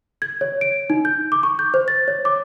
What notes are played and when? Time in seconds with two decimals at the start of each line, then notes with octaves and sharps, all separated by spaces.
0.22 G#6
0.41 C#5
0.61 D7
0.90 D#4
1.05 G6
1.32 D6
1.43 C#6
1.59 G6
1.74 C5
1.88 A6
2.08 C#5
2.25 D6